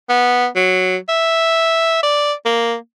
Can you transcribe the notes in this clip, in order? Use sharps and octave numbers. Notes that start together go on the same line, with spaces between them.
B3
F#3
E5
D5
A#3